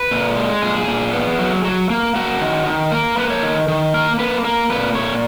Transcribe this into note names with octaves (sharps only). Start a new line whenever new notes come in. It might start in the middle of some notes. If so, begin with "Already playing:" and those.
Already playing: B4
A#2
G#3
A#2 G#4
A#2
B3
F#3
F#3
A#3
A#3 F#4
D#3
D#3
A#3 A#4
A#3 B4
C#5
D#3
D#3
A#3 A#4
A#3 B4
A#3 A#4
A#2 B4
A#2 C#5